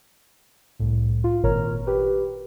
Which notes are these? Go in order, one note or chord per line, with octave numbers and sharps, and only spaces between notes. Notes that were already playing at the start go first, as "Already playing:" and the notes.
C2 A2
F4
G#1 A#2 A#4 C#5 A#5 F6
G4 B4